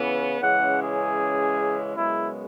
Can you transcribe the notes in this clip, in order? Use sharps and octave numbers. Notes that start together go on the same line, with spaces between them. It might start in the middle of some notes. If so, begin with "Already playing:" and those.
Already playing: C#3 E3 B3
C#3 E3 G#3 C#4 F#5
G#4
F#2 C#3 G#3 B3 E4